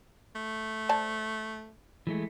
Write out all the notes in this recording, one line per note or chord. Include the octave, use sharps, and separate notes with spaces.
A3
C5 D5 A5
E3 G#3 A3